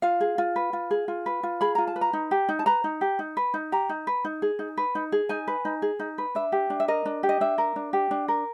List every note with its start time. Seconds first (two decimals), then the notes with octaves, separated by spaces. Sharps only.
0.02 F4 F5
0.21 G#4
0.38 F4
0.56 B4
0.73 F4
0.91 G#4
1.08 F4
1.26 B4
1.43 F4
1.61 G#4 B5
1.75 F4 A#5
1.87 A5
1.96 B4
2.01 A#5
2.13 D#4
2.31 G4
2.49 D#4
2.59 A5
2.66 B4 A#5
2.84 D#4
3.01 G4
3.19 D#4
3.37 B4
3.54 D#4
3.72 G4 A#5
3.89 D#4
4.07 B4
4.25 D#4
4.42 G#4
4.59 D#4
4.77 B4
4.95 D#4
5.12 G#4
5.29 D#4 G#5
5.48 B4
5.65 D#4
5.82 G#4
6.00 D#4
6.18 B4
6.35 D4 E5
6.52 G4
6.70 D4
6.80 E5
6.88 A#4 D#5
7.06 D4
7.23 G4
7.29 D#5
7.41 D4 E5
7.58 A#4
7.76 D4
7.93 G4
8.11 D4
8.28 A#4